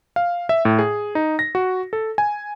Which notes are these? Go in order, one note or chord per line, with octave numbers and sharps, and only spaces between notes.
F5
E5
A2
G#4
D#4
A#6
F#4
A4
G#5